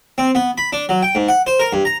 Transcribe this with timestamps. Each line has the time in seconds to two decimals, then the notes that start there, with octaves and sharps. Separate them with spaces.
0.18 C4
0.35 B3
0.58 B5
0.72 D4
0.89 F#3
1.03 G5
1.15 G#2
1.28 F#5
1.47 C5
1.60 A#4
1.73 G2
1.85 A#5